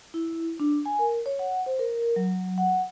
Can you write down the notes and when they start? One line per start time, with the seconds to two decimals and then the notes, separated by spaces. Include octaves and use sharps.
0.14 E4
0.60 D4
0.86 G#5
0.99 A#4
1.26 C#5
1.39 F#5
1.66 C5
1.79 A#4
2.16 F#3
2.58 F#5